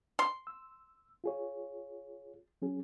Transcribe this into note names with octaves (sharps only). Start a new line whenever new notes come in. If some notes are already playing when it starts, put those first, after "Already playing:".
C6
E6
F4 G#4 C#5
F#3 C#4 G#4